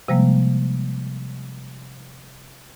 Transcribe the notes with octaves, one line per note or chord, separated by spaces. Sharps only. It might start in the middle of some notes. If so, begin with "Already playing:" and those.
C3 F3 G3 G#3 A#3